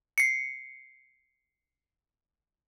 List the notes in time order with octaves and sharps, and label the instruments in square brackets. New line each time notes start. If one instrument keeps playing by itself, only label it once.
[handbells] C7 C#7